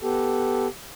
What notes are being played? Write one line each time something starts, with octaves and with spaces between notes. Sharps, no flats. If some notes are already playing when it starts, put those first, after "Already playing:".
B3 G4 A4